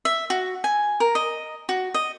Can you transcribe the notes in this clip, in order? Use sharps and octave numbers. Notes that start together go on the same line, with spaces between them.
E5
F#4
G#5
A#4
D#5
F#4
D#5